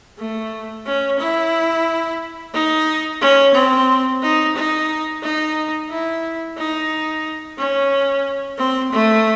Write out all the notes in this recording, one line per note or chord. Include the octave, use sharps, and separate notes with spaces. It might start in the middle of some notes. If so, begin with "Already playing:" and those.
A3
C#4
E4
D#4
C#4
C4
D#4
D#4
D#4
E4
D#4
C#4
C4
A3